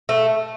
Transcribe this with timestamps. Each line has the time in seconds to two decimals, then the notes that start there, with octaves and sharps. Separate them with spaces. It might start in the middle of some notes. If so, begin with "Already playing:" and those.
0.09 A3